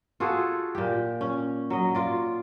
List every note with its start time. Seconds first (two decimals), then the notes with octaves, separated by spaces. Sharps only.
0.20 F4 F#4 G#4 A4
0.75 A#2 G4
1.21 C#4
1.70 F#3 D#5
1.95 F4 D5